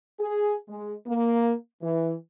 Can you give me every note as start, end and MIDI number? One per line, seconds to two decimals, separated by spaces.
0.20 0.56 68
0.69 0.93 56
1.07 1.53 58
1.82 2.14 52